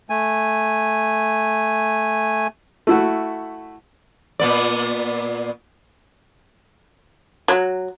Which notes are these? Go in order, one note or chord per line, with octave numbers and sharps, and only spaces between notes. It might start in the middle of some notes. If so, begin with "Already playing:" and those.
A3 G#5
A3 E4 F#4
A#2 B3 D5
F#3